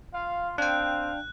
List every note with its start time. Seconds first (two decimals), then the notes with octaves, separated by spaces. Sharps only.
0.14 F4 F5
0.58 C4 D4 F5 G5 F#6